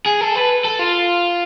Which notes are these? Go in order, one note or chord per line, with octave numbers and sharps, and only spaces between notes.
G#4
A4
B4
A4
F4